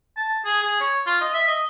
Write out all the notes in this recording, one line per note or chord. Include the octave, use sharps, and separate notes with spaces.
A5
G#4
G#4
C#5
F4
D#5
E5
D#5